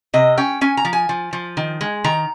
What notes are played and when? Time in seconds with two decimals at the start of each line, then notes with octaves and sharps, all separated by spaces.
0.14 C3 D#5
0.37 C#4 G5
0.61 C#4 G#5
0.77 A#5
0.85 F3
0.93 G#5
1.09 F3
1.33 F3
1.57 D#3
1.81 G#3
2.04 D#3 A#5